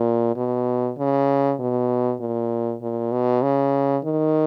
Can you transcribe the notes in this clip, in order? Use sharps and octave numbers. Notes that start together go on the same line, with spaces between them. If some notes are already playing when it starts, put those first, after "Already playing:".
Already playing: A#2
B2
C#3
B2
A#2
A#2
B2
C#3
D#3